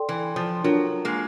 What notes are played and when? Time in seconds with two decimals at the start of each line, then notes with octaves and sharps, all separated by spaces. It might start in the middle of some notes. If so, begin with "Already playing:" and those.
Already playing: A4 D5 G5 C6
0.09 E3
0.36 F3
0.64 F#3 D4 F4 A#4
1.05 G#3 A#3